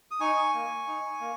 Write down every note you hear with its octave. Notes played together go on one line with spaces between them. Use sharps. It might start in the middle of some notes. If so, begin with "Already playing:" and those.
D#6
D#4 G#5 C#6
A#3
D#4
A#3